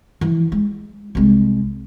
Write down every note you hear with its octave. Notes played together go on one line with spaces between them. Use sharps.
E3 F3
G#3
C2 G#3